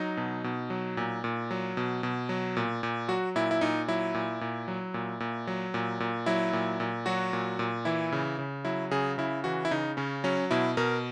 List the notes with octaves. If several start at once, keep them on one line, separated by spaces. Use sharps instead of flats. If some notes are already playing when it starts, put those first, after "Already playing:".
Already playing: F#3 D#4
B2
B2
F#3
A#2
A#2
F#3
B2
B2
F#3
A#2
A#2
F#3 F#4
A#2 E4
E4
A#2 D#4
F#3 E4
A#2
A#2
F#3
A#2
A#2
F#3
A#2
A#2
F#3 E4
A#2
A#2
F#3 F#4
A#2
A#2
E3 E4
C#3
C#3
F#3 E4
C#3 G#4
C#3 E4
E3 F#4
E4
C#3 D#4
C#3 C#4
F#3 C#4
B2 E4
B2 A#4